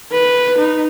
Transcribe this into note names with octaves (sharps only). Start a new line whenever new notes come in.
B4
D#4